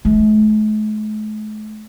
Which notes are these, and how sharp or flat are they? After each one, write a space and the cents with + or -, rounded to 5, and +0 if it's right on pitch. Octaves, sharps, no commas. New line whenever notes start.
A3 -45